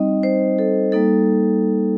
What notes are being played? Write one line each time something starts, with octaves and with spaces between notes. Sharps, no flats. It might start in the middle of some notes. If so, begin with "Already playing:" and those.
Already playing: G3 C4 D#4 D#5
C5
A4
G3 A#3 D#4 A4